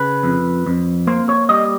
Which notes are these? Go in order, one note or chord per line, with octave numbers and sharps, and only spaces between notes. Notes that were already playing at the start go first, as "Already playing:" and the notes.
Already playing: C#3 B4
F2
F2
A#3 C5
C#5
G3 D#5